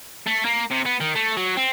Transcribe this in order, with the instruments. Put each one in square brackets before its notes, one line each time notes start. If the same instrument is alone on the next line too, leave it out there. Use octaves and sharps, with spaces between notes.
[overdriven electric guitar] A3
A#3
C3
B3
D#3
A3
F#3
C4